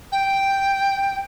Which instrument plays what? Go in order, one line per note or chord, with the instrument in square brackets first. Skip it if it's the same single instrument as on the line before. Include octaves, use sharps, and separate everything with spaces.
[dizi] G5